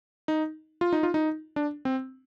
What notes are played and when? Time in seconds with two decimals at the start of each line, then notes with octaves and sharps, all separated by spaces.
0.28 D#4
0.81 F4
0.93 D#4
1.03 F4
1.14 D#4
1.56 D4
1.85 C4